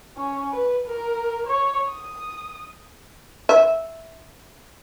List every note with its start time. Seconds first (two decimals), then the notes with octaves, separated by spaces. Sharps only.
0.17 C#4
0.52 B4
0.87 A#4
1.46 C#5
1.90 D#6
3.49 E5